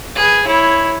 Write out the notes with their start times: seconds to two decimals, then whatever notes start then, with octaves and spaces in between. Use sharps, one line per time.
0.15 G#4 B4
0.45 E4 C#5